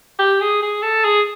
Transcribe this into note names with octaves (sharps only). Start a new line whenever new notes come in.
G4
G#4
G#4
A4
G#4